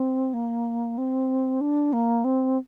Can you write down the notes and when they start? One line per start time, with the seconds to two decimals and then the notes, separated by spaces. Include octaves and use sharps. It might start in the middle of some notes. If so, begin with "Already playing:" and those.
Already playing: C4
0.34 A#3
0.98 C4
1.61 D4
1.93 A#3
2.24 C4